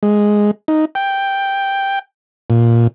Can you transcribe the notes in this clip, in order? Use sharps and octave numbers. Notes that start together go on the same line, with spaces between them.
G#3
D#4
G5
A#2